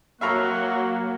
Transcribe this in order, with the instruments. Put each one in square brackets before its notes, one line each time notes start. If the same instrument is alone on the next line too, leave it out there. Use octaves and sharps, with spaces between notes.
[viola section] F#3 [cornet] A#3 [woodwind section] F#4 [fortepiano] E5 F5 A#5